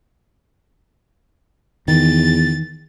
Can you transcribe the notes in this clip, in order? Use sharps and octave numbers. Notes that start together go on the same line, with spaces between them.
E2 D#3 A6